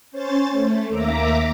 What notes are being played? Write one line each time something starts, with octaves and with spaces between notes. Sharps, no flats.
C#4 C5 C#5 A6
A3
D#2 A#3 E5 A#5 D6